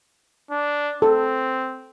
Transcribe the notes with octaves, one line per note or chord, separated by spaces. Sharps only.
D4
C4 A4